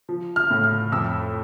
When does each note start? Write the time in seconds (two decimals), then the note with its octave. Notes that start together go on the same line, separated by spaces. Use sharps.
0.09 F3
0.36 F6
0.51 A2
0.64 F6
0.92 F2 E6